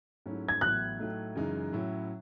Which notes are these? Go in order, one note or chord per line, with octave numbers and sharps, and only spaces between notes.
G#2 F#3 A3 C#4 E4
G#6
A1 A2 F#3 B3 E4 F#6
A2 F#3 A3 D#4
F#2 C#3 E3 G#3 D#4
A2 F#3 C#4 E4